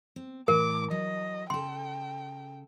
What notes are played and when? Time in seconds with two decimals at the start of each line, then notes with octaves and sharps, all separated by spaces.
0.16 C4
0.48 A2 E3 A#4 D6
0.91 F#3 D#5
1.50 C#3 A4 G5 C6